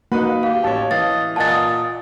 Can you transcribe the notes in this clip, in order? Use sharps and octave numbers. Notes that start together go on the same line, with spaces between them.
A#3 D#4 F#4 B4 F#5 B5
G4 F5
A1 C#5 A5
E3 D#5 F5 A6
A#2 D#5 F#5 G#5 A5 A6
D#6 A6